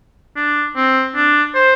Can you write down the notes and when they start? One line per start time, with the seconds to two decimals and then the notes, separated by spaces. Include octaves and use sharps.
0.36 D4
0.76 C4
1.15 D4
1.55 C5